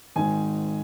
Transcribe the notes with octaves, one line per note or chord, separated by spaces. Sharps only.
G#1 G#2 D#3 G#5